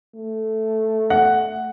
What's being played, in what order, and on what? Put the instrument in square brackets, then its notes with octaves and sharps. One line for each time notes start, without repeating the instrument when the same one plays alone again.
[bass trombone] A3
[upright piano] F#5